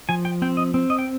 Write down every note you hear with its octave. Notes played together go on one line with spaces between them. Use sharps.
F3 G#5
G5
C4 G5
D#5
C4
D#5
G5